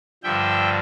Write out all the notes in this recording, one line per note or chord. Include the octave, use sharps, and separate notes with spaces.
G2 D3 F3 E5 G5